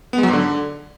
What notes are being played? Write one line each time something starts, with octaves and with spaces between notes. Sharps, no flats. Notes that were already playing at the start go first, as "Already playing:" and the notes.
B3
G#3
F#3
G#2
D3